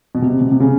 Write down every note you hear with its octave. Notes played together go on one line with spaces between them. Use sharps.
B2
C3
C3
C3
C#3